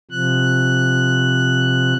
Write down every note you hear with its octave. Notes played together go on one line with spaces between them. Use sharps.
C3 F3 F#6